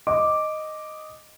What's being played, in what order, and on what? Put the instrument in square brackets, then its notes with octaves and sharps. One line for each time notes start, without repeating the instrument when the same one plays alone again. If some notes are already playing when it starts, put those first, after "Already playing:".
[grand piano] D#5 D6